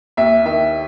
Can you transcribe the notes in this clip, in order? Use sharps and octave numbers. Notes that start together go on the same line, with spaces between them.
D#2 E5
D#3 E5